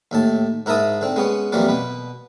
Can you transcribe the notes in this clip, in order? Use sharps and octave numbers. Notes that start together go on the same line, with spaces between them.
D#2 A2 A5
G#2 E4 A#4 E5 A5 D#6
D3 C4
G#3 B3 C#4
F2 E3 F#3 G3 A#3 F4
B2 B4